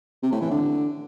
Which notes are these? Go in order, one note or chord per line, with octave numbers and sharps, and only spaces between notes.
C3
A2
E3
D3